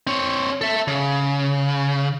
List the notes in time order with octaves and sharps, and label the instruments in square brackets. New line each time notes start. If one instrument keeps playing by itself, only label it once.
[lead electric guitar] C4 C#5
A4 E5
C#3